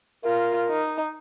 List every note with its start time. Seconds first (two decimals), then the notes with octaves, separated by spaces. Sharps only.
0.25 F4 A#4
0.69 D#4